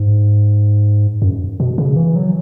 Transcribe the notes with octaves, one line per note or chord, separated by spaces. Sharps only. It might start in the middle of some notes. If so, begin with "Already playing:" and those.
Already playing: G#2
F#2
B2
C#3
E3
F#3